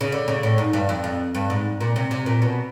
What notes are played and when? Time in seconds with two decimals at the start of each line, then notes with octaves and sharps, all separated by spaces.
0.01 C#3
0.12 D3
0.28 C#3
0.43 A2
0.58 G#2
0.73 G2
0.89 F2
1.04 F2
1.35 G2
1.50 G#2
1.81 A#2
1.96 C3
2.11 C3
2.26 A#2
2.42 B2